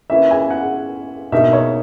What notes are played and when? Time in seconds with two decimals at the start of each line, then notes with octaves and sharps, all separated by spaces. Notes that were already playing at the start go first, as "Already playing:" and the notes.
0.10 A#3 C#4 E4 B4 E5
0.31 G#5
0.50 F#5
1.32 B2 A#3 D#4 A#4 E5
1.53 C#5